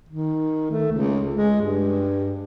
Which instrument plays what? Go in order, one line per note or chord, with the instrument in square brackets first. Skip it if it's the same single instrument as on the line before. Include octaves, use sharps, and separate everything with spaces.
[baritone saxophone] D#3
A3
C#2
G#3
G2